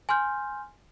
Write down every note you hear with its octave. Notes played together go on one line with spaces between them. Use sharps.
G#5 C6 F6 G6